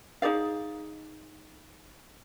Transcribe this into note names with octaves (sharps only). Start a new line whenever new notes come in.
D#4 G#4 D5 F5